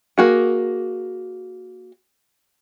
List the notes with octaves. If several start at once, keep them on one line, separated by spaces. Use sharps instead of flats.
A#3 F#4 G#4